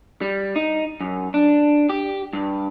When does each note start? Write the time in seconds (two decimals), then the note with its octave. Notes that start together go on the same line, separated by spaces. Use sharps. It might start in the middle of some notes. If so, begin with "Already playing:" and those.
0.21 G3
0.56 D#4
1.01 F#2
1.34 D4
1.90 G4
2.33 G2